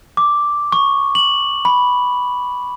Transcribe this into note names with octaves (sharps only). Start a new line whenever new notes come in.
D6
C#6
F#7
B5